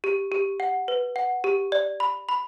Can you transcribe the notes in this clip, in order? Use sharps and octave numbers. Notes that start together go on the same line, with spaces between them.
G4
G4
F#5
B4
F#5
G4
D5
B5
B5